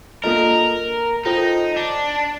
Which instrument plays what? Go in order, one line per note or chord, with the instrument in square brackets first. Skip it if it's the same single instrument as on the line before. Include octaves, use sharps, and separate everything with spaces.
[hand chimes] A#3 D4 F4 A4 D#5 [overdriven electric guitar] A#4
[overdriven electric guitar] D#4 [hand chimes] F4 A4 C5 G5
[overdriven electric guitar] D4